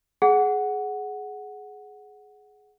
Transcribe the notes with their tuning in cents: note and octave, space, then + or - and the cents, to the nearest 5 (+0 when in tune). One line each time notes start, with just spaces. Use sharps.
G#4 +15 F#5 +0